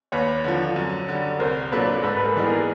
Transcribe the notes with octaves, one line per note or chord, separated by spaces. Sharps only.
D#2 B4 C#5
D3 F3
F#2
D3 G3
C2 A#4 C5
A#2 F#3 A#3 D4 A4 B4
G#2 A4 B4
B4
G#4 A#4
E3 G3 B3 D#4
G#4 A#4